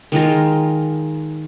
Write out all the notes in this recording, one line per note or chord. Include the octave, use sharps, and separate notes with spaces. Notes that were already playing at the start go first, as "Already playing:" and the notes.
D#3 G#3 F4 A#5